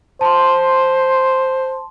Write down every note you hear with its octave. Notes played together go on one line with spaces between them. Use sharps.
C5 A5 C6